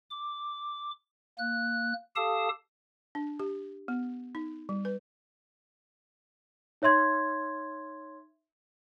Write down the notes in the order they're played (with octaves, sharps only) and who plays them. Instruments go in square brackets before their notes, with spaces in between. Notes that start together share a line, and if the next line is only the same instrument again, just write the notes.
[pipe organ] D6
A#3 F#6
G4 A4 F5 A5 D#6
[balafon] D4
G4
B3
D#4
G3
B4
[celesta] D#4 C#5 E5 C6 G#6